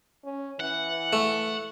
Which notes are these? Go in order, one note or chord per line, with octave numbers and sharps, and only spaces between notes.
C#4
E3 F#5
A3